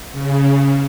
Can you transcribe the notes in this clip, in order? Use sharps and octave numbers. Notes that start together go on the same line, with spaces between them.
C#3